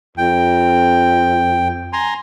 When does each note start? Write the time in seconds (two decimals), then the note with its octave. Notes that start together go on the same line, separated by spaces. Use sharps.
0.18 F2 G5
1.93 G#5 A#5 C6